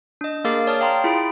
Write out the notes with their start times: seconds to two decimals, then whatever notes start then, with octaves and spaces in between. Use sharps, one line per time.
0.21 D4 D#5
0.44 A#3 G#4 A#4 F5 D6 A6
0.67 C#5 D5 A5 D#6 F6
0.81 F5 G5 A#5 C6
1.04 E4 F4 G#4 B5 D7